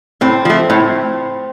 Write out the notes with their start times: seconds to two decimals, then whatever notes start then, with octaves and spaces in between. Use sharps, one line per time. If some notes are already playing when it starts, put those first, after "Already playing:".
0.21 A2 C4
0.45 F3 A3
0.70 A2